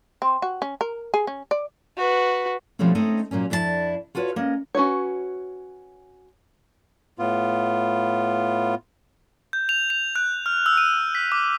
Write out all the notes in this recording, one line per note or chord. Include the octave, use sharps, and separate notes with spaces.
C4
F#4
C#4
A#4
G#4
C#4
D5
F#4 B4
B2 F3 G3 A3 C4 C#4
A3 C4 C#4 D#4 D#5
A#2 F#3 A#3 C#4
F2 D4 E4 G4 A5
F4 F#4 A4 B4 C#5
A#3 C#4 D#5
C#4 F#4 B4 C#5
A2 B3 F4
G6
F7
F7
F#6
F6
E6
D#7
B6
D6